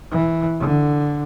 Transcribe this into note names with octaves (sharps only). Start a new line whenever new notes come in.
E3
D3